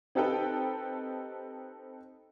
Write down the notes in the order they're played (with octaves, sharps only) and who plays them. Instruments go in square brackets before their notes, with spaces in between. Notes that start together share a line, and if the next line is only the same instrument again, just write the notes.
[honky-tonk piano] C4 D#4 G4 A4 B4 G5